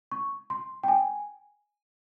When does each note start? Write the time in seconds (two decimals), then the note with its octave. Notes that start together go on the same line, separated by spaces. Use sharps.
0.12 C#6
0.50 C6
0.83 G5
0.88 G#5